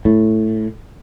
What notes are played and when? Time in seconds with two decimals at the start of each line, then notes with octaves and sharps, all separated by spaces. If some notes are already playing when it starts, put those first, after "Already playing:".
0.05 A2